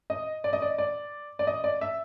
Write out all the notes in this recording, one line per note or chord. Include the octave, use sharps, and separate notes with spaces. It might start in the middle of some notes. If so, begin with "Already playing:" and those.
D#5
D5
D#5
D5
D5
D5
D#5
D5
E5